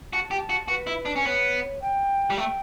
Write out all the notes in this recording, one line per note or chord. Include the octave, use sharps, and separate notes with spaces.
F#4 A5
G4
F#4
F#4 B4
E4
D4
C#4
B3 C#5
G5
G3
A3 G5